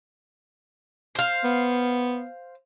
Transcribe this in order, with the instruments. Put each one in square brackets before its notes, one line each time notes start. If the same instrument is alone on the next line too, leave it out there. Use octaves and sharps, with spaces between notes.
[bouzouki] C5 F5
[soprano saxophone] B3